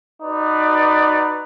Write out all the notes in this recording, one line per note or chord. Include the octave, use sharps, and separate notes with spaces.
D#4 F#4 B4 D5